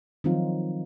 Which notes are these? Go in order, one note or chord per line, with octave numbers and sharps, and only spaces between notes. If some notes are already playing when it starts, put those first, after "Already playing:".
D#3 F3 F#3 C4 D#4 F4